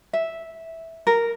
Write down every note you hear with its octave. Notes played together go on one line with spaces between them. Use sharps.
E5
A#4